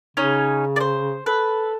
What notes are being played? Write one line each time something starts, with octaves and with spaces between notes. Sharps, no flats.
C#3 C#4 D#4 C#5
C5 D5
A4 B4